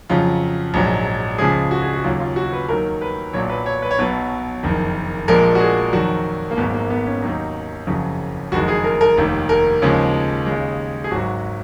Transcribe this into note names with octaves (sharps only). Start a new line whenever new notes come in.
F2 C#3 F#3 F4
A#1 G#2 F#3
C#2 C#3 F3 G#3 G#4
F#4
G#4
F#4
D#2 C#3 F#3 F4
F4
F#4
B4
D#2 D#3 F#3 A#4
B4
B1 A#2 F#3 C#5
B4
C#5
B4
C#5
B1 B2 F#3 B4
F#1 F2 D#3
A#1 A#2 F3 G#3 A#4
F#4
G#4
F2 D#3 F#3 F#4
A#3
G#1 G#2 F#3 B3
A#3
B3
C#4
D#2 D#3 F#3 D#4
F#1 F2 C#3 F#3
F#1 F2 D#3 G#3 F#4
G#4
A#4
A#4
F1 D#2 D#3
A#4
D#2 C#3 F3 G#3
D#2 C#3 G#3
G#4
G#1 G#2 F#3 F#4